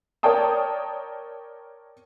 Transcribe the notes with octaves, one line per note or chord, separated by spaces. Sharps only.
A#4 C#5 D5 G5 A5 D#6